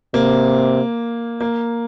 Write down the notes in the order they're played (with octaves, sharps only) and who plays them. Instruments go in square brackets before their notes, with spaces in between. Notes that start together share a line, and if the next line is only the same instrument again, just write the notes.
[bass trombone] C3 [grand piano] A#3
[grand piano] A#3